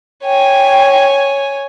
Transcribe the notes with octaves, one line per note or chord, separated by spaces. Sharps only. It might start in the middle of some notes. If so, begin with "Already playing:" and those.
C#5 G5 G#5